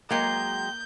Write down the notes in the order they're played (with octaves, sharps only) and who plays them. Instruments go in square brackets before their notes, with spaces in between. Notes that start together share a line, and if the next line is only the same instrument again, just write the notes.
[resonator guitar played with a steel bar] F#3 G#3 [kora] A#3 [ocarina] G5 [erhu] G6